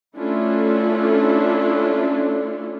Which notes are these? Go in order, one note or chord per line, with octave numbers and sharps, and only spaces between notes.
A3 C#4 D4 E4 F4 A4